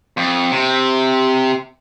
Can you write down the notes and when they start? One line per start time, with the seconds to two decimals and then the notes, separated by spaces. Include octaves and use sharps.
0.17 F2
0.52 C3